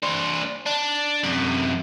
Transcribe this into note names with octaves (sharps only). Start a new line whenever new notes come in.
D4 C5
D4
F#2 C3